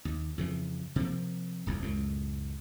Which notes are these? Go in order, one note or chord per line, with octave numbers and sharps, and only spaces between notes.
D#2
F2 C#3 E3
C3 F3 A#3
D#1 C2 F2
C#2 F#2 A2